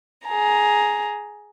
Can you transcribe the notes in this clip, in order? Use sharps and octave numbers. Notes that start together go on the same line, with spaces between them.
G#4 A#5